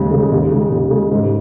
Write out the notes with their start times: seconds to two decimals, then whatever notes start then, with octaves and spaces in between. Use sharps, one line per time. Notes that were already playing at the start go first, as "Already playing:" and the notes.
Already playing: D#2 C#3 G#3
0.11 C#3 G#3
0.31 D#2
0.51 C#3 G#3
0.72 D#2
0.91 C#3 G#3
1.11 G#2